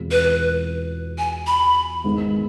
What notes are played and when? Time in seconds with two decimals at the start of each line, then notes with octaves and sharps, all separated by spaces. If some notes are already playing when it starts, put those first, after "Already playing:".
Already playing: E2 B2 G#3 C4 F4
0.11 B4
1.18 G#5
1.47 B5
2.04 G#1 G#2 G#3 B3